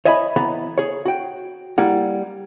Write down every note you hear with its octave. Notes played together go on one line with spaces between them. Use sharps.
C#5 D#5 E5 G#5 A5 B5
E3 B3 A#5 B5
G#4 C#5
F#4 G5
G3 A#3 E4 F#5